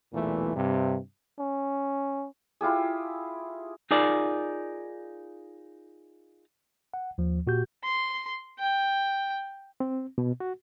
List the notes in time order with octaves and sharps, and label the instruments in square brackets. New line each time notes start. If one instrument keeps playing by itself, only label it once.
[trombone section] B1 E2 A#2 E3 A3
G2 C3
[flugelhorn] C#4
[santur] E4 F4 G4 G#4
[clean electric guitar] D#4 F4 G#4 A#4 D5
[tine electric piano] F#5
D#2 F3
A#2 F#4 G4 G6
[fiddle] C6
G5
[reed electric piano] C4
B2
F#4